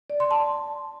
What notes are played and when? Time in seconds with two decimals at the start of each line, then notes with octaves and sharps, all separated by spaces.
0.10 D5
0.20 C6
0.31 A5